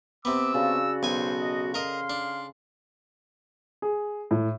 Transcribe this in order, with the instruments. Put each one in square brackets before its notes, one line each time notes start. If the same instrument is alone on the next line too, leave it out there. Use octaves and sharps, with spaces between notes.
[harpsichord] C3 B3 [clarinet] D6 [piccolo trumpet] E6
[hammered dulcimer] C#3 D5 A5 [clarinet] F#4
[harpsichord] B1 G#5 [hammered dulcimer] A4 [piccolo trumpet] C5
[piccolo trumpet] D#5
[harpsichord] A#4 D#5 [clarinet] F5 [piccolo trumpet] C6
[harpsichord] D4
[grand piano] G#4
A2